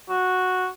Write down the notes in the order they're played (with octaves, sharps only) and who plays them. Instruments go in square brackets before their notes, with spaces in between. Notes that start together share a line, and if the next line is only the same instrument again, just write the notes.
[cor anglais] F#4